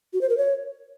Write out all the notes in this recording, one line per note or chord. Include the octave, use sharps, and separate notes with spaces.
F#4
C5
A#4
C#5